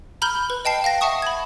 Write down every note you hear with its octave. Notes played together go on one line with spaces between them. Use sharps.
A#5 B5 F6 G6 G7
B4
D#5 G5 A5 C7
F5 G5 A#6
E5 F#5 A5 C#6 D#6
B5 G#6